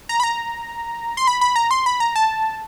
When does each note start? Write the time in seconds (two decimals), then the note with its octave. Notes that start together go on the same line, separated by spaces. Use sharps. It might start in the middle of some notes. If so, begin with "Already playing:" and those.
0.09 A#5
0.20 B5
0.23 A#5
1.17 C6
1.27 B5
1.41 B5
1.56 A#5
1.71 C6
1.86 B5
2.00 A#5
2.16 A5